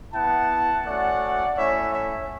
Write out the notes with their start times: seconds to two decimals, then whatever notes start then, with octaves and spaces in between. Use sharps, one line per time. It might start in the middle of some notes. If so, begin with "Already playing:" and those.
0.13 B3 E4 F#5 A5
0.85 A3 C#4 F#4 D5 F#5
1.57 A3 C#4 E4 C#5 E5
1.93 C#5 E5